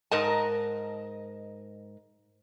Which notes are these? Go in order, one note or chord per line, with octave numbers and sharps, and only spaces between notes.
G#2 A#4 D#5 A5